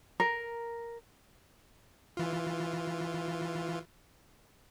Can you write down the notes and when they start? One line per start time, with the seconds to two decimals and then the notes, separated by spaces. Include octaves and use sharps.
0.20 A#4
2.17 E3 F4